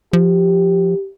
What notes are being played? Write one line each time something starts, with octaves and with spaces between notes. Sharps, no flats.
F3 G4